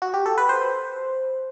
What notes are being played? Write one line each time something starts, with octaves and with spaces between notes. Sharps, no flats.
F#4
G4
A4
B4
C5